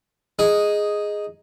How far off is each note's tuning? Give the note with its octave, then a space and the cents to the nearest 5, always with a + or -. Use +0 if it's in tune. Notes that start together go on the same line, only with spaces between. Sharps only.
D#4 +0 G#4 +0